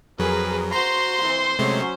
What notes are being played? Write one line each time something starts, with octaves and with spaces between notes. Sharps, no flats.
F2 F#3 G#4 A#4 B4
F#4 C5 A#5 C6
E3 C4
C3 F#3 G#3 A3 C#4